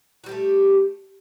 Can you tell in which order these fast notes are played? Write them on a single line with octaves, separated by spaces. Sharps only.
F#4 G3 G4 A3